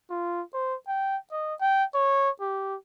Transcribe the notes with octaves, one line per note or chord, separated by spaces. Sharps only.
F4
C5
G5
D#5
G5
C#5
G4